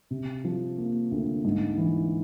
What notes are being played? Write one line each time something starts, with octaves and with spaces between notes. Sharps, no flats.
C3
F3
A#3
D2
G#2
E3